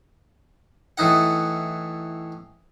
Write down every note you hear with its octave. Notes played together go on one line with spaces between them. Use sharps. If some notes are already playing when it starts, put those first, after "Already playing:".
A2 E3 D#4 F#5